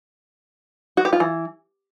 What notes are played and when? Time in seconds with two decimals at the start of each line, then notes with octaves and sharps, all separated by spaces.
0.97 F#4
1.05 G4
1.13 F4
1.20 E3